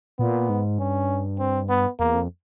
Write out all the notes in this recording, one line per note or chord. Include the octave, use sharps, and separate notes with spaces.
A#2 B3
G#2
G2 C#4
C4
B3
E2 A#3
F2